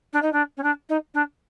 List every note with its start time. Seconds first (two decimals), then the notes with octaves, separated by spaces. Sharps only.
0.13 D4
0.22 D#4
0.33 D4
0.57 C#4
0.63 D4
0.89 D#4
1.14 D4